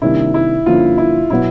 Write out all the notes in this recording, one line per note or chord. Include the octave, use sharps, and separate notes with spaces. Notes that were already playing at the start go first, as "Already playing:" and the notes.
C3 D#3 G3 A#3 D4 E4
E4
G2 D3 F3 A#3 C#4 F4
E4
B2 F#3 B3 E4